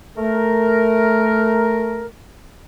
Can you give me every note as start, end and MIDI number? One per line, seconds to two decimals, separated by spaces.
0.16 2.05 57
0.16 2.05 70